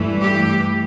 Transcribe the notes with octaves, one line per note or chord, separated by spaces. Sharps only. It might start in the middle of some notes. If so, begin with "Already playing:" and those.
Already playing: G2 E3 A3
G4